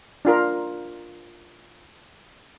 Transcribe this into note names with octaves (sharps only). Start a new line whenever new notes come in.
D4 F4 A#4